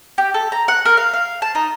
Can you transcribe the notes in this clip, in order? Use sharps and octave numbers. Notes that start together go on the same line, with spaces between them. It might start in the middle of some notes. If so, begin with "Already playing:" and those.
G4
A4
A#5
F#5
A#4
F5
F5
A5
D#4